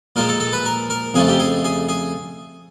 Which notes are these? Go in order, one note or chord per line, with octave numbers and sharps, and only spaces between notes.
A#2 F3 G#3 A#4
A4
A4
B4
A#4
A#4
F2 C#3 F3 A3 G#4
G4
G#4
G#4
G#4